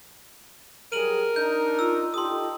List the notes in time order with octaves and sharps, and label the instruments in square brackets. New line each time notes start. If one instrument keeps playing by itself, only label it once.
[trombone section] F#3 G3 G#4 [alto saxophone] A#4 [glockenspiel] D#7 F#7
[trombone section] D4 D#4 [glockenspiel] G6
[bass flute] F4 [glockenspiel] E6
[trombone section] D#4 G4 A4 [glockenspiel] C6 D#6